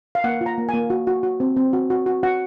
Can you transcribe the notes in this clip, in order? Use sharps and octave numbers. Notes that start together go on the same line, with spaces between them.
F5
A#3 F#5
F4
A#5
A#3
G#5
A#3
F#4
F#4
F#4
C4
C4
F#4
F#4
F#4
F#4 F#5